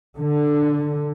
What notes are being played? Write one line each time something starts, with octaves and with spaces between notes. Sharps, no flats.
D3